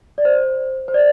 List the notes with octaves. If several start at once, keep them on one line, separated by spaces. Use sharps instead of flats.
D5
C5
C5
D5